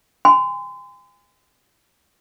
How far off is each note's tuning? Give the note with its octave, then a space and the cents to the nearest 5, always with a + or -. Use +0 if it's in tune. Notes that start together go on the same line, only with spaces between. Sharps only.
G#5 -35 C6 -40